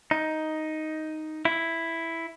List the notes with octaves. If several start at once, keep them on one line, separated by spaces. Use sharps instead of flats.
D#4
E4